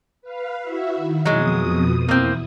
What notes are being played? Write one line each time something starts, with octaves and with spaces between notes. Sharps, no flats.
B4 F5
E4 F#4 E5
D#3
F2 B2 F#3 G#3 D#6
E2 A#3 C4 E4